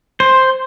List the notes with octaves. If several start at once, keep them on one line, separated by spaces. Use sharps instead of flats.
C5